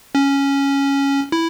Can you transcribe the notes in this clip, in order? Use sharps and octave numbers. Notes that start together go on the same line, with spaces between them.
C#4
E4